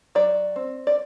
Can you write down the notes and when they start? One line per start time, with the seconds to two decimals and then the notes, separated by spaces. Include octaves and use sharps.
0.15 F#3 D5
0.56 C4
0.87 D5